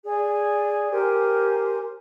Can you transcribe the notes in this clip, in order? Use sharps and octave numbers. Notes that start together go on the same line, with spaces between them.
G#4 D5
G4 A#4 C5 G#5